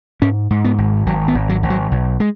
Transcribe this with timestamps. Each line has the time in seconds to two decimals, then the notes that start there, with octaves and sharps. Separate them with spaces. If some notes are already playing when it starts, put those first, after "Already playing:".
0.22 G#2 C#4
0.51 G#2
0.64 B3
0.78 G#1
1.06 G#1 F#3
1.28 B3
1.35 G#1
1.49 F#3
1.63 G#1
1.70 F#3
1.91 B1
2.20 G#3